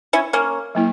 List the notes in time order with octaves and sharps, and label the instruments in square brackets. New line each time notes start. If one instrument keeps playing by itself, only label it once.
[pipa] C#4 E4
A#3 C#4
[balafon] F#3 A#3 E4